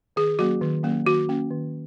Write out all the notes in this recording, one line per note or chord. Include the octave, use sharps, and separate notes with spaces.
D#3 G#4
F#3 A#3 C#4 F#4
D#3
F#3 A#3 C#4
D#3 F#4
A#3 C#4
D#3